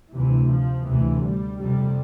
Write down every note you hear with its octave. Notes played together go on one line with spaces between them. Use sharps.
D2 C3 E3
F3
D2 C3 E3
G3
F2 C3 G3